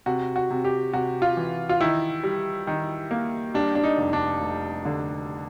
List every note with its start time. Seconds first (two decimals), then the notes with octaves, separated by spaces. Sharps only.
0.06 C3 F#4
0.36 F#4
0.50 C3
0.65 G4
0.93 C3 F#4
1.22 F4
1.37 E3
1.69 F4
1.80 D#3 E4
2.23 G3
2.67 D#3
3.11 A#3
3.54 G3 D4
3.75 D4
3.84 D#4
3.97 F1
4.13 D4
4.41 F1
4.85 D3